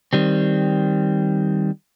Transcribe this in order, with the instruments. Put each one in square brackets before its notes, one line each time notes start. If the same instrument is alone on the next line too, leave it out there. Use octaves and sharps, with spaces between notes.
[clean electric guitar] D#3 G3 C4